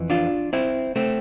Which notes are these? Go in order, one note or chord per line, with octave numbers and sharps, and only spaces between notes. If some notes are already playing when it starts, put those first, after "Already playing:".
Already playing: F2 E3
D4 F4
C4 E4
A3 C4